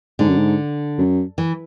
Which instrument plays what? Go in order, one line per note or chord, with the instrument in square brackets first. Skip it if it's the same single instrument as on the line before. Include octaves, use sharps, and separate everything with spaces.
[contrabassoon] G#2 [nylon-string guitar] D3
[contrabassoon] F#2
G#2
F#2
[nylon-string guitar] E3